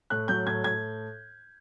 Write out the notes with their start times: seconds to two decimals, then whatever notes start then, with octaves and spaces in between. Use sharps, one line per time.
0.10 A2 F#6
0.28 F#3 G6
0.47 A2 G#6
0.64 A2 G#6